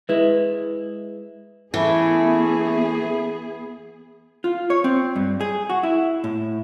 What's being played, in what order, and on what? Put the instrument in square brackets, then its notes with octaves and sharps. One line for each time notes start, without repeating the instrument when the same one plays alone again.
[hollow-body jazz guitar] G#3 E4 [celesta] B4
[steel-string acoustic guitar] E3 [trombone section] A3 C#4 A4 [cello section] B3 G#4 [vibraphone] E5 B5
[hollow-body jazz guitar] F4
C#5
C4
G2
G#4
F#4
E4
A2